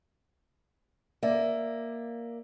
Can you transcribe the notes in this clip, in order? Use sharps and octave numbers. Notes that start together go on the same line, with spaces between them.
A#3 D5 E5